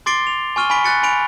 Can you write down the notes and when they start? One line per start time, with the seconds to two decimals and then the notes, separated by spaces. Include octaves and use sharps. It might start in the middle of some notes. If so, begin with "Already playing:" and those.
0.06 C6 D6 A6 C7 D7 G7
0.27 F7
0.56 G#5 C#6 F6 D#7 G7
0.70 G#5 B5 C#6 B6 D7 G7
0.84 F#6 A6 C#7
1.03 G#5 B5 D7 F7